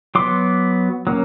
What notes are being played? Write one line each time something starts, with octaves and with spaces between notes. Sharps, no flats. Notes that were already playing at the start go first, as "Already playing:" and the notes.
F#3 B3 C6 D6
F#3 A#3 C#4